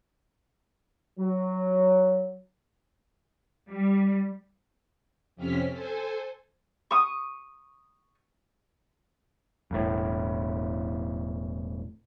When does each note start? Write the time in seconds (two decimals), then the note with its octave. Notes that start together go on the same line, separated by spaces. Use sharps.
1.19 F#3
3.69 G3
5.36 F2 C3 C4 C#4 F6 B6
5.70 A4 C5 G#5
6.91 C#6 D#6
9.71 E1 A2